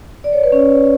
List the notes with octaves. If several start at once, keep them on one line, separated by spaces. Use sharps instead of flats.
D5
C#5
B4
C#4 C#5